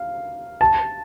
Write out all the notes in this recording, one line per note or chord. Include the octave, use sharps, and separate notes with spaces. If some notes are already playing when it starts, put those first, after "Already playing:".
Already playing: F5
A5